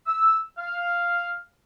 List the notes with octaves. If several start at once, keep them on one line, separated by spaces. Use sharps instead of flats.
E6
F5